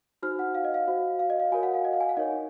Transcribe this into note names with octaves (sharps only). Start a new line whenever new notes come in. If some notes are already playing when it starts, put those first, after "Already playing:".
D#4 F#4 C5 F6
F#5
F5
D#5
F5
F#4 C5
F5
D#5
F5
F#4 A#4 C#5 G#5
F#5
F5
D#5
F5
G#5
F#5
D#4 A#4 C#5 D#5